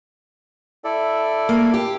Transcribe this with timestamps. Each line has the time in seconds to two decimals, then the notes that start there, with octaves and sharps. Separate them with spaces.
0.84 E4 A4 D5
1.49 A#3
1.74 G4